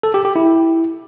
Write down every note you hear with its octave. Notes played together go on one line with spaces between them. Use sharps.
A4
G4
G4
E4